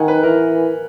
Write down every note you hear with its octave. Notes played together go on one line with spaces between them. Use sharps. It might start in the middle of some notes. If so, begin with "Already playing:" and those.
Already playing: D#3 F#5 G#5
B4
E3 A#4